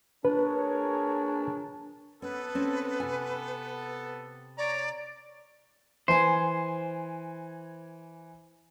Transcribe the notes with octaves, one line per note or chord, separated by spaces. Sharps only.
D4 G#4 A#4 B4 C#5
B3 C#4 A4 B4
C4 C#4
C3 G#5
C#5 D5 A#5
E3 C5 G#5